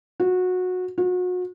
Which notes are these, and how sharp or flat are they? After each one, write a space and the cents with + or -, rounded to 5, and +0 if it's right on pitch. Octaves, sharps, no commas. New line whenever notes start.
F#4 -20
F#4 -35